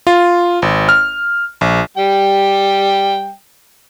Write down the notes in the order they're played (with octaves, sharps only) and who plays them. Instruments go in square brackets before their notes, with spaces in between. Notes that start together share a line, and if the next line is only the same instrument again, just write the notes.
[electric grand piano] F4
G#1
F6
A#1
[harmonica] G3 G5